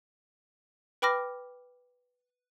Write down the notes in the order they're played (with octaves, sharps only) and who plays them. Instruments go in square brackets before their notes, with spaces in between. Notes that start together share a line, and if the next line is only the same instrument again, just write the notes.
[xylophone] B4 G5 B5 D6 F6 A#6